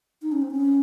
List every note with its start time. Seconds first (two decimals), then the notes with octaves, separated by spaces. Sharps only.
0.22 D#4
0.32 C#4
0.42 C4
0.51 C#4